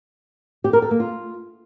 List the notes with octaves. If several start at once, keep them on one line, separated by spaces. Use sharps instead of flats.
G4
A#4
A4
A#3
F4